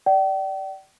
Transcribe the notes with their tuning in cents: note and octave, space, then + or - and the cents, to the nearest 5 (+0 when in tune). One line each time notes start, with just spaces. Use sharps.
D5 +5 G5 -40